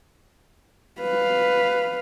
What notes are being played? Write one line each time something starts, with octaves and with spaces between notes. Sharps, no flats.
B4 F5